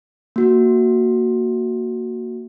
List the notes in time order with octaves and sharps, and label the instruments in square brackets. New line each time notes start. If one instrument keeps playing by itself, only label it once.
[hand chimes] A#3 F#4